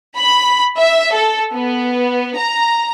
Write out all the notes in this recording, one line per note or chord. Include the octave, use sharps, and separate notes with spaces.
B5
E5
A4
B3
A#5